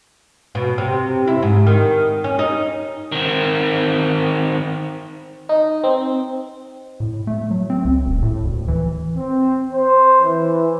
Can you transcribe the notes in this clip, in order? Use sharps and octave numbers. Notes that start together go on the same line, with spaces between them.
B2
C3
E4
G#2
D#3
C#4
D#4
D#3 C4
D#4
C4
A2
A3
F#3
C4
C#2
D#1
A2
D2
E3
C4
C5
E3